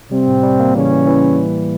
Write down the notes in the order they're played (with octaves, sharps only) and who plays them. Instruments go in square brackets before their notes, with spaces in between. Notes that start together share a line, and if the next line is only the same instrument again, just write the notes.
[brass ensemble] C3 C4 [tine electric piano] G3
[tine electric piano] A2
G3
A#3
[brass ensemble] C#3 C#4 [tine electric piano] E3
[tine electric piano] E3
E3